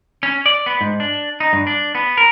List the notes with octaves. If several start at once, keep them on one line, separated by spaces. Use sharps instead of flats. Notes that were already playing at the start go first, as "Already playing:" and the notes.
C#4
D5
B3
G#2
D4
D#4
G2
D4
B3
A#4